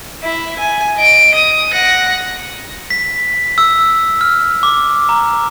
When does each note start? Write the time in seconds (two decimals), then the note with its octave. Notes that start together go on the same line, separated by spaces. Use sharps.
0.23 E4
0.59 G#5
0.97 D#5 D7
1.35 D#6
1.72 F#5 A#6
2.90 B6
3.58 E6
4.21 F6
4.63 D6
5.09 A#5